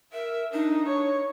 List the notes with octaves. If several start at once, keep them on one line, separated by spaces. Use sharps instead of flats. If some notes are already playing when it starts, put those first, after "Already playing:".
A#4 E5
D4 D#4
C#5